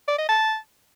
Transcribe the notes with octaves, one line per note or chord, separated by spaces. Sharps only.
D5
D#5
A5